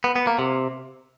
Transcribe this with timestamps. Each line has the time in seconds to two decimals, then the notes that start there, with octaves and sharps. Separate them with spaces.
0.04 B3
0.16 B3
0.27 A#3
0.39 C3